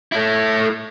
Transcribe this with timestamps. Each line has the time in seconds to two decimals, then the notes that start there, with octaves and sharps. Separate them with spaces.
0.12 A3 E4